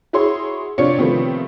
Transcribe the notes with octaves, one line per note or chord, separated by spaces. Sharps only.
E4 F#4 G#4 C#5 C6
C3 D4 F4 C#5 D5 C#7
C3 D#3 F3 A3 B3 C4